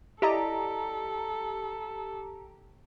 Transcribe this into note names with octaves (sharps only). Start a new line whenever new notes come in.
E4 G4 A4 D5 D#5 A#5